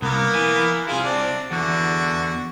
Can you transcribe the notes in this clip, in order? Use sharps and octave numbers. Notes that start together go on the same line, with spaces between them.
C2 A#3 B3 A#4
E4 G#5
C3 E4 F4 G#4
C4 D4
E2 D3 F#4